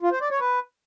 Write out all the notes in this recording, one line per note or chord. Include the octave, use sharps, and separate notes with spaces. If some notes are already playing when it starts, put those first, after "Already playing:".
F4
C5
D5
C#5
B4